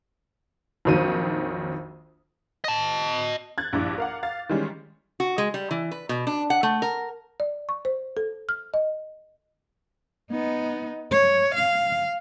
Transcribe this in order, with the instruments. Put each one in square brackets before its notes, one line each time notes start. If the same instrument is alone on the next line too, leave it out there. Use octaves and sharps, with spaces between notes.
[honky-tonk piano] A#1 F2 D#3 F#3 D#7
[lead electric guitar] D#5 A5
[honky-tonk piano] F#6 G#6 A6
A#1 G2 E4 D6
A#4 F5 F#5
F5 A6
D#3 E3 G3 G#3 C#4
[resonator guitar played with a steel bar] F#4
G#3
G3
E3
B4
B2
D4
F#5
A3
A#4
[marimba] D5
C#6
C5
A4
F6
D#5
[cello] B3 D#4
C#5
F5